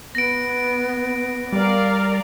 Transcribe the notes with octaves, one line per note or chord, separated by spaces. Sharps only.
B3 A#6 D7
G3 A#4 D5 F5